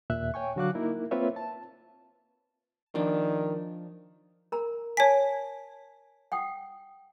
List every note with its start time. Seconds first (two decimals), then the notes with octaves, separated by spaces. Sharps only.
0.10 D#2 A#2 E5 F#6
0.34 C#5 G5 G#5 C#6
0.56 D3 F#3 F#4 F5 D6 F#6
0.75 A#3 D#4 E4 A#4
1.11 A#3 C4 F4 B4 C#5 E5
1.36 A5
2.95 D#3 F3 D4
4.52 A#4 A#5
4.97 C#5 G#5 A5 B6
6.32 F#5 G5 D#6